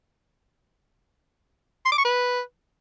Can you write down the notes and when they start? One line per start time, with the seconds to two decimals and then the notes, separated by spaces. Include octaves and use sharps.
1.86 C6
1.92 D6
1.99 C#6
2.05 B4